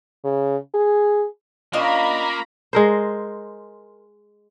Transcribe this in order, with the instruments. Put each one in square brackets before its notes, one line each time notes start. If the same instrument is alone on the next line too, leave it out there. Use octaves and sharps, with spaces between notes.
[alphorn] C#3
G#4
[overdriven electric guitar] A#3 [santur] C#4 F4 [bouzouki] D4 D#5 [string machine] A#5 B5
[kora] G#3 A#4 C5